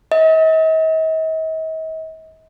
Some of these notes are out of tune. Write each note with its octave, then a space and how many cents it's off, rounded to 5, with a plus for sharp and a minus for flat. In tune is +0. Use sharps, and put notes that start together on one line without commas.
D#5 +45